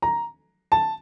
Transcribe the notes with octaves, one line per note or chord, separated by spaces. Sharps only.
A#5
A5